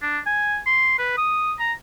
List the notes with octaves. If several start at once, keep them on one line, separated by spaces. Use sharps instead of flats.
D4
G#5
C6
B4
D#6
A#5